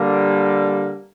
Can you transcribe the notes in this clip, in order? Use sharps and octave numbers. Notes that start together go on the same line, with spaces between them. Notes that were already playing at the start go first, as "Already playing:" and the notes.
Already playing: D3 G3 A#3